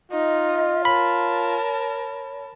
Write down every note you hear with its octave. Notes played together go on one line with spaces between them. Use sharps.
D#4 F4 D#5
A#4 C#5 A5 B5